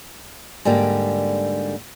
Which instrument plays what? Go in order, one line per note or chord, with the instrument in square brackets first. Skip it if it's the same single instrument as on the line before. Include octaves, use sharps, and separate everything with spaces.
[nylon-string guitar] G#2 D3 G3 A#3 G4